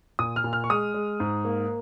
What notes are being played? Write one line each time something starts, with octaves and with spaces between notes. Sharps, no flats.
A#2 D#6
F6
A#2
F6
C#6
G#3 D#6
G#3
G#2
A#3